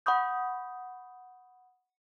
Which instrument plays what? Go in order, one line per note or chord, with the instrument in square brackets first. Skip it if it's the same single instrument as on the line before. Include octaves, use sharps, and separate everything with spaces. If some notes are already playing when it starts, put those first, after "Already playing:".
[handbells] F#5 B5 C#6 D#6 G6